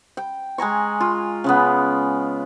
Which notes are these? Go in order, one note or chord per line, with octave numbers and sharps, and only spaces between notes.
G5
G#3 G#5 A#5 C#6
F4
C#3 G#3 B3